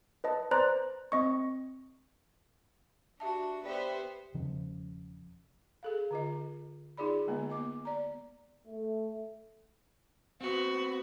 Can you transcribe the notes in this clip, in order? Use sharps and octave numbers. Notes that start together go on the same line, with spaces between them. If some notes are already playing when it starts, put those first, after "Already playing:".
B4 D#5 A5
B4 C5 D5 A#5 C6 F#6
C4 D#5 C#6
D4 F#4 G4 E5 A5
B3 G4 B4 C5 D5 E5
E1 C#3 F3 C#4
G#4 A4 F5
D3 F4 D#5
D#4 F4 G#4 D5 B5
D3 G#3 A#3 B3
B3 D#5 D6
D5 A#5
A3
B3 C4 F#4